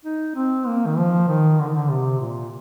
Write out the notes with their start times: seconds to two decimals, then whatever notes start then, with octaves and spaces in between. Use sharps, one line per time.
0.05 D#4
0.36 C4
0.67 A#3
0.87 D#3
0.98 F3
1.28 D#3
1.59 D3
1.67 D#3
1.75 D3
1.91 C3
2.20 A#2